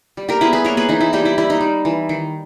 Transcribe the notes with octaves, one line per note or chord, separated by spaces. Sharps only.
G3
G4 A#4
B3 E4 G#4
G#4 B4
A#3 A#4 C#5
G#4 B4
E3 D#4
E4
G3 D#4 G4
E4
G3 E4
D#4
G3
E3
D#3